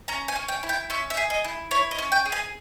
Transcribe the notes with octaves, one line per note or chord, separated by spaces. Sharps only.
C#4 A#5
G#5
C#4
G5
E4
G5
C#4 E5
E5
G#4
D#5
E4
E4 C#5
D#5
C#4
G5
G#4
G#5